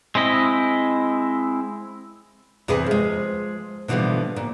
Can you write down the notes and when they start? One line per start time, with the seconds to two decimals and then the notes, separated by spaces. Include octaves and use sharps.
0.15 G#3 C4 E4 D#5
2.68 E2 C3 G#4 B4 G#5
2.86 F3 G#3
3.88 B2 D3 E3 F3 G3 B3
4.36 A#2